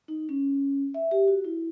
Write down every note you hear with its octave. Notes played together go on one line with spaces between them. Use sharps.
D#4
C#4
E5
G4
F#4
E4